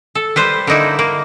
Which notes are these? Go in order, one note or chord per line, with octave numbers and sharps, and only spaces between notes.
A4
G3 B4 C5
D3 A#3 D#4 E4
A#3